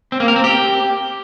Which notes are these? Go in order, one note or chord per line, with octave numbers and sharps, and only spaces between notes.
C4
A#3
A#4
C4
G4